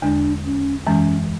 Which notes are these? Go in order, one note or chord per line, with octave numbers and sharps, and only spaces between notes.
E2 D3 G#3 D4
C#4
F#2 E3 G#3 C#4